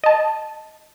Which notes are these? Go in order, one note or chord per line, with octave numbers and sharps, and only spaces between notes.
D#5 A5